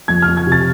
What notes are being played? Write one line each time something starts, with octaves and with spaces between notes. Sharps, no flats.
F2 G#6
F6
F2
G#6
C3 A6